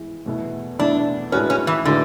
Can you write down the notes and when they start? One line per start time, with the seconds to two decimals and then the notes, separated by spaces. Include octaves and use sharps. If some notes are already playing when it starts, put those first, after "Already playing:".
Already playing: E3 G#3 B3 E4
0.26 E2 B2 A3 E4
0.79 E2 B2 A3 D4 E4
1.32 A2 G#3 C#4 D4 F#4 B4
1.50 C#4
1.67 E3
1.85 A2 D3 G#3 D4 F#4 B4